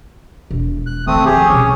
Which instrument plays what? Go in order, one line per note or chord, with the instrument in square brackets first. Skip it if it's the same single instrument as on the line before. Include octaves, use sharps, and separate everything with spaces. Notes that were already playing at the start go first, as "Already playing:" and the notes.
[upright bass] E1
[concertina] F#6
[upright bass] D#3 F3 [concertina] A3 C4 D#6
[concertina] G4 G#4
[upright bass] C2 B2 [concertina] C#4 C#5